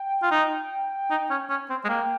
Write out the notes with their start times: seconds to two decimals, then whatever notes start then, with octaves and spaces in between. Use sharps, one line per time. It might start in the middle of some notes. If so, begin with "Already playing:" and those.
Already playing: G5
0.22 F4
0.31 D#4
1.10 D#4
1.30 C#4
1.50 C#4
1.70 C4
1.85 G#3
1.89 A#3 G5